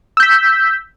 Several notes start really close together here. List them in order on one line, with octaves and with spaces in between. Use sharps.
E6 G6 B6